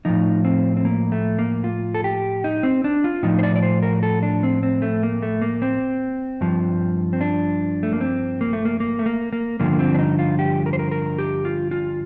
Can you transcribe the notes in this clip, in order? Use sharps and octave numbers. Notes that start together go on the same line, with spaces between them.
A2 F3 D#4
C4
C4
A#3
A3
A#3
F4
A4
G4
D#4
C4
D4
F4
A2 F3 D#4
C5
D5
D5
C5
A#4
A4
D4
C4
C4
A3
A#3
A3
A#3
C4
G2 F3
C4
D4
A3
A#3
C4
A#3
A3
A#3
A#3
A3
A#3
A#3
G2 D3 F3 A#3
A#3
C4
D4
D#4
F4
G4
A#4
C5
A#4
A#4
G4
F4
F4